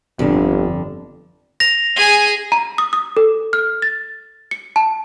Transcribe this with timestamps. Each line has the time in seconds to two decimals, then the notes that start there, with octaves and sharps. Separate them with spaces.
0.19 G1 F2 D3
1.60 A#6 F7
1.96 G#4 G#5
2.52 A#5
2.78 D#6
2.93 D#6
3.17 A4
3.53 F6
3.82 A6
4.51 C#7
4.76 A5